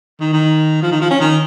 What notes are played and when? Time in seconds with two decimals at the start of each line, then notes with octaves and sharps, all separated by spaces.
0.20 D#3
0.33 D#3
0.82 F3
0.92 D#3
1.01 F3
1.10 C#4
1.20 D#3